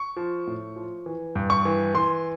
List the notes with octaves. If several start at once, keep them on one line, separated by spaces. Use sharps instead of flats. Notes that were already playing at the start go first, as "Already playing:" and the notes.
Already playing: C#6
F3
A2
F3
E3
G2
C#6
E3
E3 C6